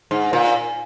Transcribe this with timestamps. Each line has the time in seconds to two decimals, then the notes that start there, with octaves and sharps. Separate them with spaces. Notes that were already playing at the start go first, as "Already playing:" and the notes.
0.11 G#2
0.33 A#2